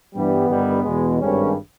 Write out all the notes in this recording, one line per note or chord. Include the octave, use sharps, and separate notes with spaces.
G2 E3 G3 B3
G1 G2 D#3 G3
E2 B2 G#3
G#1 G2 G3 C#4